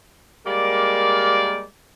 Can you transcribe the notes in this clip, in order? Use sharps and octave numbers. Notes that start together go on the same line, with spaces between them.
G3 G#3 A#3 A#4 D5